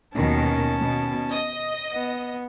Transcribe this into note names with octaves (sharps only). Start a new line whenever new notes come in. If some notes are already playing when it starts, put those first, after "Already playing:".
D#2 B2 D#3 C#4 A5
B2
D#5
B3